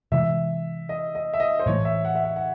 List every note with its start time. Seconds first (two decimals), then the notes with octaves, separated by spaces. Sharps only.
0.12 C3 E3 G#3 E5
0.89 D#5
1.15 D#5
1.34 E5
1.40 D#5
1.59 C5
1.66 A2 E3 A3 C#5
1.85 E5
2.05 F#5
2.15 E5
2.24 F#5
2.36 F#5